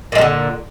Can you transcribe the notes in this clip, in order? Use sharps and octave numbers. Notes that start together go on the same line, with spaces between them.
A#2 D3 G3 G#3